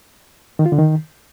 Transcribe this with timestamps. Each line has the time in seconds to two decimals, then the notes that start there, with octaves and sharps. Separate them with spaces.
0.59 D#3
0.66 F4
0.72 D3
0.78 D#3